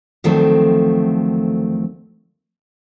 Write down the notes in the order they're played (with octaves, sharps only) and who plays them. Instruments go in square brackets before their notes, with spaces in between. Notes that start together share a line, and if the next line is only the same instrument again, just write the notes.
[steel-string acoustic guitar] D2 D#3 F3 F#3 A3 C4